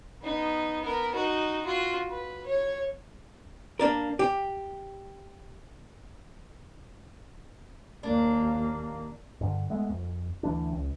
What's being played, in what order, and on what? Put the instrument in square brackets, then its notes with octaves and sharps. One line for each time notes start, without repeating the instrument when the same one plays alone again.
[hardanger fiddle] B3 D#4
B3 A#4
D#4 F#4
F4 F#4
B4
C#5
[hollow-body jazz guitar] A#3 D4 A#4
G4
[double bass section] D#2 A#3 [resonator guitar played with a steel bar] D4
[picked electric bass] G2 D3
G#3 A3 B3
F2
D2 E3 D4
C#2